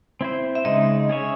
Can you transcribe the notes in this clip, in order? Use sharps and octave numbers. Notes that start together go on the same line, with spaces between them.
C4 E4 C5
E5
C#3 G#3 D#4 D#5
C#4 G#4 C#5 E5